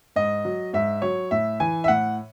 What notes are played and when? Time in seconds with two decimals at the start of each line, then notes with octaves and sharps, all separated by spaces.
0.16 G#2 D#5
0.45 F#3
0.73 G#2 E5
1.02 F#3 C#5
1.31 A2 E5
1.60 E3 G#5
1.84 E5
1.88 A2 F#5